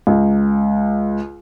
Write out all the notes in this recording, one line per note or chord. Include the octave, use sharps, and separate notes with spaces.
C#2